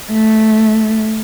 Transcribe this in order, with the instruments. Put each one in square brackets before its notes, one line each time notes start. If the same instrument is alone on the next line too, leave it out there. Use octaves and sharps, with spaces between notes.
[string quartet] A3